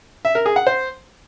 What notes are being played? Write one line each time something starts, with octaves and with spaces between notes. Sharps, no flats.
E5
A#4
G#4
F#5
C5